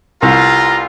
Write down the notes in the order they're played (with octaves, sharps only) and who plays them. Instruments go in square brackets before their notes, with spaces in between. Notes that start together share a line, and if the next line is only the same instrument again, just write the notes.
[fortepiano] C2 [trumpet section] G3 B3 F4 [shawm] A#5